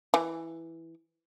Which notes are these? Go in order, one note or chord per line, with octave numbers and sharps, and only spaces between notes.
E3